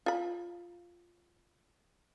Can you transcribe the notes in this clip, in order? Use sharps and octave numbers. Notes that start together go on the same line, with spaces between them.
F4 B5